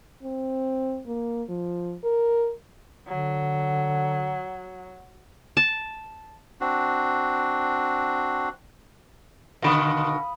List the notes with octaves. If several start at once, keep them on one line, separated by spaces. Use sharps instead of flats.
C4
A#3
F3
A#4
D3 F#3
A5
C4 D4 F#4
B2 D3 D#3 F5 B5 D#6